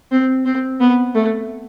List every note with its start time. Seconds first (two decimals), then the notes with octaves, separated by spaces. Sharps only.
0.12 C4
0.46 C4
0.80 B3
1.15 A3